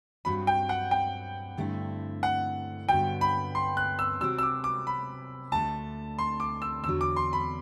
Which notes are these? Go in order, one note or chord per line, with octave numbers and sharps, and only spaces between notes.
G2 F#3 C4 B5
G5
F#5
G5
G2 D3 A3 C4 E4
F#5
G2 D3 F#3 B3 G5
B5
C6
F#6
E6
C3 F#3 C4 E6
E6
D6
D6
B5
D2 D3 A3 A5
C6
D6
E6
E2 D3 F#3 E6
D6
C6
B5